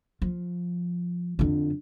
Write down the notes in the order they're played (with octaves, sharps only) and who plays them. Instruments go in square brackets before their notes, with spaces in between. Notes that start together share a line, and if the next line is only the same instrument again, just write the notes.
[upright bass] F3
F2 D3